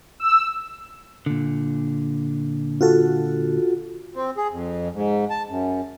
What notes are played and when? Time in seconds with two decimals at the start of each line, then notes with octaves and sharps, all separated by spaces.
0.20 E6
1.26 A#2 D3
2.81 F4 F#4 A4
4.16 C4
4.37 G#4
4.52 F2
4.93 G#2
5.30 A5
5.49 F#2